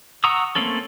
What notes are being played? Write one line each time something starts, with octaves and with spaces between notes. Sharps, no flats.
F#5 A#5 C#6 D#6 E6
A3 A#3 C4 C#4 A4